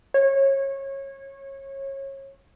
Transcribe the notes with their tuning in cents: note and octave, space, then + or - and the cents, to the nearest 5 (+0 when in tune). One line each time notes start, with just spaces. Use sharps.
C#5 -25